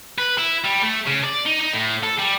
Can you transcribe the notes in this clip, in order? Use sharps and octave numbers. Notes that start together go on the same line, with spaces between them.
B4
E4
G3
A3
C#3
D5
D#4
D#4
A2
A4
G3